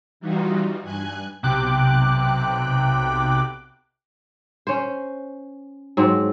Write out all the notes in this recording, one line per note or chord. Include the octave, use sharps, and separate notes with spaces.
E3 G3 D#4 F4 F#4
G2 G#5 F#6 G#6
B1 C3 G5 D6 F#6
C#4 C5
G#2 F#3 C4